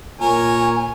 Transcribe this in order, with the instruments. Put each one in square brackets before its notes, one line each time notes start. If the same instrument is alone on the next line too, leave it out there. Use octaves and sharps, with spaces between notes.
[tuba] A#2 [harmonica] A#4 C#5 [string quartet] G#5